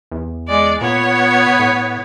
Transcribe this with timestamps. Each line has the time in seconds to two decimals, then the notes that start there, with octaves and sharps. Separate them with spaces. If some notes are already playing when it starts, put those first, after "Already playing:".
0.12 E2
0.48 G#3 D5
0.81 A#2 B3 C#5
1.59 A2